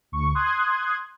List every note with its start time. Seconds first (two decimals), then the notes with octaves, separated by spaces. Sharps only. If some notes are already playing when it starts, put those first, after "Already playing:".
0.12 D2 C#6
0.35 C6 D#6 F#6 G#6